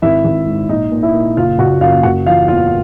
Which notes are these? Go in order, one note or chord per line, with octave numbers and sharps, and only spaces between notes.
G#1 E4 E5
G#1
G#2
A#1 D#4 D#5
A#2
E4 E5
A#2
F#1 F4 F5
F#1 F#4 F#5
F#2 F4 F5
F#1 F#4 F#5
E3 F4 F5
E2 F4 F5